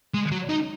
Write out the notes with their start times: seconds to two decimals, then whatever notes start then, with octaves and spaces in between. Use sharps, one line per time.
0.14 G#3
0.32 F#3
0.49 D#4